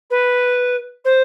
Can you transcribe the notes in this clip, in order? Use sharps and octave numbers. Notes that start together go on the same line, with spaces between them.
B4
C5